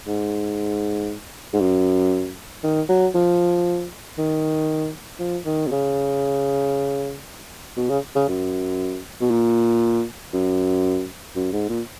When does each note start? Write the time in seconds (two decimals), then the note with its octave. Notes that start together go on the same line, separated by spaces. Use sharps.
0.07 G#2
1.53 G#2
1.61 F#2
2.64 D#3
2.89 F#3
3.14 F3
4.18 D#3
5.19 F3
5.45 D#3
5.67 B2
5.71 C#3
7.77 B2
7.89 C#3
8.15 C#3
8.28 F#2
9.21 B2
9.30 A#2
10.33 F#2
11.36 F#2
11.52 G#2
11.69 A#2